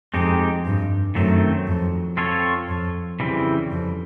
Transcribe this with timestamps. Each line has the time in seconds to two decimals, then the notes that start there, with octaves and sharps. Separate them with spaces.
0.14 F2 G#3 C4 D#4 G4
0.65 G2
1.15 F#2 D#3 F#3 A3 C4
1.67 F2
2.17 C4 F4 A4 C#5
2.69 F2
3.20 C#3 E3 G3 C4 E4
3.71 F2